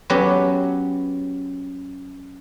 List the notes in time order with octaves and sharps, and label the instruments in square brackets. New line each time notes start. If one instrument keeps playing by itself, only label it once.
[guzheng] F#3 B3 C#4 G4